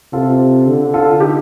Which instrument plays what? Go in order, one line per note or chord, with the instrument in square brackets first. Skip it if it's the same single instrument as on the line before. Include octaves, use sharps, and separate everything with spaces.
[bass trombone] C3 [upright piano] F4 A4
[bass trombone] D3
[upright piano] F4 A4
D#4 G4